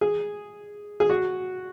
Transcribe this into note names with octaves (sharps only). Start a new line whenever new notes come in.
G#4
G#4
F#4